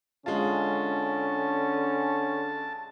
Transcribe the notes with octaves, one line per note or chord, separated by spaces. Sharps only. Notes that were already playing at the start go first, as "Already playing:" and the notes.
D3 G#3 C#4 F4 A5